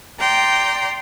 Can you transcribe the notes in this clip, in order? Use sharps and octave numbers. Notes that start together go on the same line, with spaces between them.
D5 G5 A#5 C6